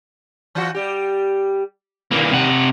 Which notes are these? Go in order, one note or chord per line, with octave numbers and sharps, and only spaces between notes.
E3 F4 F#4
G3 G4
G2 B2 D#3 E3 A#3
C3 F#5